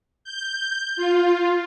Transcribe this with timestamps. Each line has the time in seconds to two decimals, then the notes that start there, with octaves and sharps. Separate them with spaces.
0.24 G6
0.97 F4